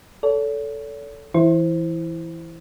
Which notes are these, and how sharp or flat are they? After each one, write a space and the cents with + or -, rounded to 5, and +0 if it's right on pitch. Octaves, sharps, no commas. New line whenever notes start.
A4 +0 C#5 +45
E3 +0 E4 +0 C5 +0